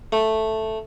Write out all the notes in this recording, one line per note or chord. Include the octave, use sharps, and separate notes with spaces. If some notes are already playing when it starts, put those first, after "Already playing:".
A3